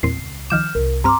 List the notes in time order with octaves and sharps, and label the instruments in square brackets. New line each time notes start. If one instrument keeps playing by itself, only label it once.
[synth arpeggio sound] E2 A#2 C4 [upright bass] G#3 [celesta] C7
[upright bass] C#2
[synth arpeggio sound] D#3 F3 D6 [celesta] F6 G6 E7
[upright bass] C2 [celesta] A#4
[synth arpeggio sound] G2 C4 F6 [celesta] A#5 C6 D6